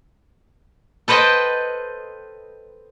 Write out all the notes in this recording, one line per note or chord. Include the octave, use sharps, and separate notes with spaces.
A4 B4 C5 D#5 G5 A5